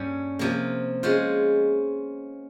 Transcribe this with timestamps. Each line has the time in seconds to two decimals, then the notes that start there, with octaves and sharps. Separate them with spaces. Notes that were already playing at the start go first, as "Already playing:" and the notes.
Already playing: G2 G3 A#3 C#4
0.39 C3 F3 A#3
1.03 G#3 C#4 F4 C5